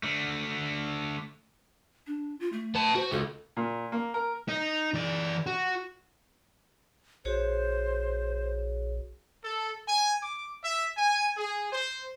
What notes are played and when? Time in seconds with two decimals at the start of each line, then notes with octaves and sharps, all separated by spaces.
0.03 D3 A3
2.07 D4
2.40 F4
2.52 A3
2.75 B3 A5
2.96 F#4 C5
3.12 C#2 A4
3.57 A#2
3.92 A#3
4.14 A#4
4.48 D#4
4.94 E3 D5
5.46 F#4
7.25 A#1 F#4 G#4 C5 C#5
9.43 A4
9.87 G#5
10.22 D6
10.63 E5
10.96 G#5
11.36 G#4
11.71 C5